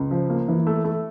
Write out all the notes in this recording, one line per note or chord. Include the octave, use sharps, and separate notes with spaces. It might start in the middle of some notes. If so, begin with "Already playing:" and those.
Already playing: C#2
F3
A#3
E3
A3
A3